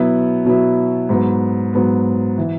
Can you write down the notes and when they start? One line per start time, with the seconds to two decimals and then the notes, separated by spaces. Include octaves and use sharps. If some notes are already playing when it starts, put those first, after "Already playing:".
Already playing: B2 F#3 B3 E4
0.45 B2 F#3 B3 E4
1.09 G#2 F#3 B3
1.73 G#2 F#3 B3
2.38 E3